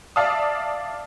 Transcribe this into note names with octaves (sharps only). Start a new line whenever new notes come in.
D5 E5 F5 A5 D#6